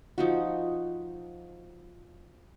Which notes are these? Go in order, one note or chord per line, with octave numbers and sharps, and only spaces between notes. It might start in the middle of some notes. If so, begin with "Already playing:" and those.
F3 D#4 F#4